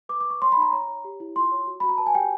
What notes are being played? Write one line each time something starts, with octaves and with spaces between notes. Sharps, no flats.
B4 D6
D6
B4 C#6
C#5 C6
B5
D#4 A#5
C#5 A#5
C#5
G4
E4
F4 C6
C#5
F#4
F#4 B5
A#5
B4 A5
G#5
G4 G5